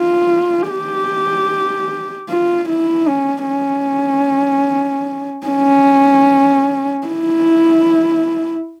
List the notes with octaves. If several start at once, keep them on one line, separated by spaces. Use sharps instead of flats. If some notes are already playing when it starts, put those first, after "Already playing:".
Already playing: F4
G4
F4
E4
C#4
C#4
C#4
E4